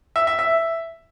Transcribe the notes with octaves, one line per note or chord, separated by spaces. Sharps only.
E5
E5
E5